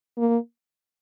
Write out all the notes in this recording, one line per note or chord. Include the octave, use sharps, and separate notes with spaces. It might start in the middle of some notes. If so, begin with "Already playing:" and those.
A#3